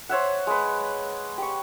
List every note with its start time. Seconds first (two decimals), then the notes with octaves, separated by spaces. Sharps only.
0.09 C5 C#5 E5 F#5
0.47 G#3 B4
1.38 G4 C#6